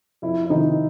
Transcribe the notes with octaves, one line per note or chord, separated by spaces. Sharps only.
F2 E4
E4
C3 D#3 D#4